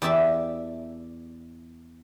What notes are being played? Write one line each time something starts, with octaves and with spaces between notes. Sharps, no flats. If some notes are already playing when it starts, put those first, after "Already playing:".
E2 G4 D5 E5 A5 B5